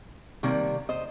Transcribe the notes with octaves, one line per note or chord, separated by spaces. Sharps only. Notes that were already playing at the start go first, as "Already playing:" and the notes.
C3 D#3 G3 A#3
C5 D#5